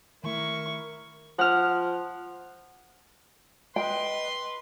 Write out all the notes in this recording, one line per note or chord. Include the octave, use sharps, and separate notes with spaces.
D#3 A3 E4 A#4 C#6
F3 F#5 F6
B4 D#5 G5 C6